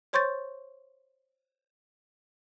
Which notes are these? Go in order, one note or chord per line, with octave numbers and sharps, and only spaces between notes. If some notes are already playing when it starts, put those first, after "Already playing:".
C5 C#5 C6 C#6 G6 A6